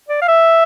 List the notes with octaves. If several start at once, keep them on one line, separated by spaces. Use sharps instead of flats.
D5
F5
E5